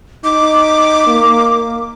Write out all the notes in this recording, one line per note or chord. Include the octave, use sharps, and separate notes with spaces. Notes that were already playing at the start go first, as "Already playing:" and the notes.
D#4 D6
A#3